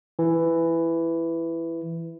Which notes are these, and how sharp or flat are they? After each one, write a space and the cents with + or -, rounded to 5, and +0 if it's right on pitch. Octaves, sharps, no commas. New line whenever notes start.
E3 +10